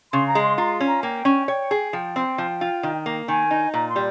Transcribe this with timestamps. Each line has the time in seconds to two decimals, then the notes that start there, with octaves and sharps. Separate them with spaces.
0.12 C#3 C6
0.27 A#5
0.35 G#3
0.43 C6
0.58 F4 A#5
0.80 C#4
0.87 A#5
1.03 A#3 G5
1.25 C#4
1.48 C#5 G5
1.71 G#4
1.93 F3 G5
2.16 C4
2.38 F3
2.61 F4
2.83 D#3
3.06 A#3
3.28 D#3 G#5
3.51 D#4
3.74 A#2 A#5
3.89 C6
3.96 G3